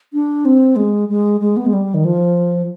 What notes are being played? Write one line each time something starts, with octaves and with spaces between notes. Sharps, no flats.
D4
C4
G#3
G#3
G#3
B3
G#3
G3
D#3
F3